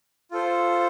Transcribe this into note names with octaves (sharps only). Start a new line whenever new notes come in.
F4 A4 C5